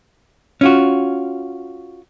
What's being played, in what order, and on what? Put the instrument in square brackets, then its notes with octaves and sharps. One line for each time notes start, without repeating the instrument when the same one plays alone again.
[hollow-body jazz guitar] C#4 F4 F#4